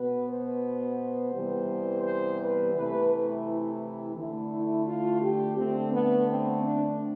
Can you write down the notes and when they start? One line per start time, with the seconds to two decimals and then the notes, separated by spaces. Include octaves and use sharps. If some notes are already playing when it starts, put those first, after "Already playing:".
Already playing: B2 B3 B4
0.26 C5
1.32 C3 E3 G3 B3
2.02 C5
2.39 B4
2.74 C3 E3 A3 B4
3.44 E4
4.15 D3 A3 E4
4.50 E4
4.85 F4
5.21 G4
5.55 D3 A3 C4
5.92 B3
6.27 C4
6.61 D4